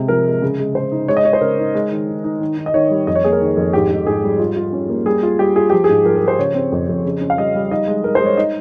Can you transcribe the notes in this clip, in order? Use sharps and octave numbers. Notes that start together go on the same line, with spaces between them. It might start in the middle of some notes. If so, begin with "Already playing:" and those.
Already playing: C3 G#3
F3 A#4
G#3
C#3
G#3
C#3 C5
D#4
G#3 C#5
D#5
G#3 C#5
C5
C#3 A#4
D#4
G#3
D#3
D#4
D#4
D#3
D#3
D#5
D#3 C#5
G3
F2 D#5
C#5
A#3 G#4
A#4
D#3
F2
G#2 G4
G#2
G#2 G#4
G3
F4
F4
C#4
A#3
G3 G#4
F4
G3 G4
F4 G#4
F3 G4
G#4
G#2
F3 A#4
A#4
F3
C5
C#3 C#5
C4
F2
F2
C#3
C#4
F5
G3 D#5
G3
D#4 D#5
G#3
G#3 A#4
C5
G#3
C#5
D#4 D#5